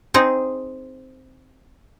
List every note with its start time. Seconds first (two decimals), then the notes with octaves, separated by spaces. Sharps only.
0.14 C4 D#4 G#4